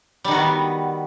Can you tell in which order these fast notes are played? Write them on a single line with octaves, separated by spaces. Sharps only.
G3 D#3 F#4 B3